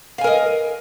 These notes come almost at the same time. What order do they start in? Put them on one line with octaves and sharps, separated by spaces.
F5 G#5 A#4 D#5